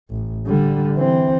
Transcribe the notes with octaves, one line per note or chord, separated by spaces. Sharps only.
A1
D3 G3
E3 C4